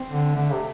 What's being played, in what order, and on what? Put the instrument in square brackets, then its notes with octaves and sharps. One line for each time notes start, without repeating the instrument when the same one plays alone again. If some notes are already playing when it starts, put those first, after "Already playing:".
Already playing: [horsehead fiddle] C4
[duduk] D3
[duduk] D3 [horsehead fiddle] A3
[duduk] C3